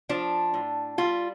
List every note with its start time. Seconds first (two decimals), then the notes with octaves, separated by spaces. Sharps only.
0.09 F3 D4
0.54 A2
0.98 G3 F4